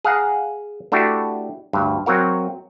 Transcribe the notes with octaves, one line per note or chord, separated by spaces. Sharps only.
G#4 F5 F#5 A#5
A3 D4 E4 F#4 G4
D2 G2
F#3 C4 F#4 A#4 F5